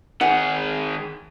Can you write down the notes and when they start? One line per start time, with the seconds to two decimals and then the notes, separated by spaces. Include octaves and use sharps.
0.21 D#3 G#4 F#5